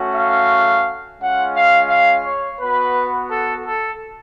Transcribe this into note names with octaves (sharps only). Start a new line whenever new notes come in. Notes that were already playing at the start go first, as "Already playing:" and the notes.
Already playing: A3 C#4 F#4
F5
G#3 C#4 F4 F#5
F5
F5
C#5
B3 F#4 B4
A4
A4